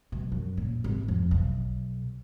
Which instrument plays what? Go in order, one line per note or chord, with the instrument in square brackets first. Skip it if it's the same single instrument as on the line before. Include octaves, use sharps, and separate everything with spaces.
[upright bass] B1
F#2
A#2
G#1
F2
B1